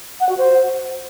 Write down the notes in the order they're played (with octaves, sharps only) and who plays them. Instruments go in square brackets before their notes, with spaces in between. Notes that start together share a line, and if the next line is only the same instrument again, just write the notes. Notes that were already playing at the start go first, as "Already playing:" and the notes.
[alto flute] F#5
F#4
C5